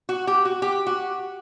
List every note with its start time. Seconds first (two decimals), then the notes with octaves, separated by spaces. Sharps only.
0.09 F#4
0.27 G4
0.45 F#4
0.62 G4
0.87 F#4